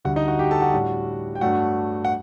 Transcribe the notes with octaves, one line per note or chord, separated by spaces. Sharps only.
D2 D3 G3 F#4 F#5
D#4 D#5
F#4 F#5
G4 G5
A4 A5
F#4 F#5
A2 G3 D4
G5
G2 F#3 A3 D4 F#4 F#5
F#5